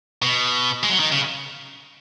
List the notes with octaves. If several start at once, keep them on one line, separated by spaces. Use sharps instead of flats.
B2
G#3
F#3
D#3
C#3